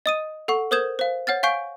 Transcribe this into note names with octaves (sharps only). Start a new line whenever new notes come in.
D#5 D#6 D#7
A4 F#5 C#6
A#4 C5 D#6 G6 G#6 E7
C5 F5
C#5 F#5 F6 A6
F5 G#5 C#6 G6 C7 D7